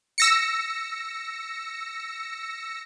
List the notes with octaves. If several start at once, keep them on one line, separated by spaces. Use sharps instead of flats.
E6 A#6 C#7